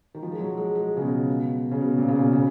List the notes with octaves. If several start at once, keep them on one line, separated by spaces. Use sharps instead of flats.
D#3
F3
G#3
F#3
G#3
G#3
C#3
B2
C#3
B2
A#2
C#3
B2
C#3